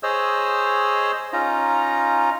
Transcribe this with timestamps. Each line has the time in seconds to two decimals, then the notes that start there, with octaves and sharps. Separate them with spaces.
0.03 G#4 C5 C#5 D#5 E6
1.33 C#4 D#4 F4 A#5